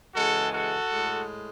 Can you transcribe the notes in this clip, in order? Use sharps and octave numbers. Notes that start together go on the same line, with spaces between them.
C#3 E3 G#3 F#4 A4
F#4 A4
A2 G#3